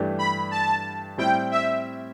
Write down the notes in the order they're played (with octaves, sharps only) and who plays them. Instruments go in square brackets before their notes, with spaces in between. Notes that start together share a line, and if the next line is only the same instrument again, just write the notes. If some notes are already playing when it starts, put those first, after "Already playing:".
Already playing: [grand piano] G2 E3 A3 D4 G4
[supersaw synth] B5
A5
[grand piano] A2 G3 C4 E4 [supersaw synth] G5
[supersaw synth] E5